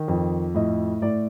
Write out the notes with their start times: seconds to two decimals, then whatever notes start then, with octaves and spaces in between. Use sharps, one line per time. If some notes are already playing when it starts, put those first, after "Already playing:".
Already playing: D#3
0.08 F2
0.54 A2 D#5
1.01 A2 D5